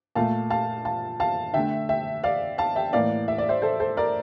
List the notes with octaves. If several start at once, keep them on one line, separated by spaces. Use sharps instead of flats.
A#2 A3 F5 A5
F5 A5
F5 A5
F5 A5
D3 A3 E5 G5
E5 G5
D5 F5
F5 A5
E5 G5
A2 E3 A#3 D5 F5
E5
D5
C5 E5
A4 C5
A4 C5
A#4 D5